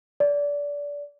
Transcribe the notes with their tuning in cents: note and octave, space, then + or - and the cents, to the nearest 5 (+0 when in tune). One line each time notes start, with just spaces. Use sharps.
D5 -25